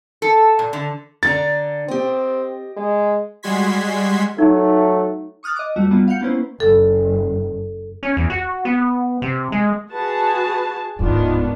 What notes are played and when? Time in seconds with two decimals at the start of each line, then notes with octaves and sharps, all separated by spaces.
0.22 A4
0.59 A#2
0.73 D3
1.23 D3 D5 A#5 A6
1.88 C4 G4 D#5
2.77 G#3
3.43 G3 G#3 F#4 C6 G#6 B6
4.38 F#3 A3 D#4
5.43 C#6 D#6 F6 F#6 A6
5.56 D#5 D6
5.76 F2 G3 A3 F#4
5.91 G3 A#3 B3 F4 F#4
6.08 F5 F#5 G6 C#7
6.21 A#3 B3 C#4 E4 B4 C5
6.60 F#1 A4
8.03 C#4
8.17 E2
8.30 F#4
8.65 B3
9.22 C3
9.52 G#3
9.91 F#4 G#4 B4 A5
10.99 D1 G#2 D#3 B3 D4 F4